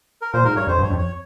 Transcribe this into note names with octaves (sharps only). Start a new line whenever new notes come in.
A#4
A#2 C5
G#2 A#4
G2 C#5
F2 C5
G2 C#5
F2
C#5